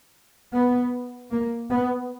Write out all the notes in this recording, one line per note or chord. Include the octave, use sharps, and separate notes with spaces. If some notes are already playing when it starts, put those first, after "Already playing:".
B3
A#3
B3